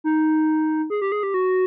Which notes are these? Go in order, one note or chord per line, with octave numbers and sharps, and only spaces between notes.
D#4
G#4
G4
G#4
G4
F#4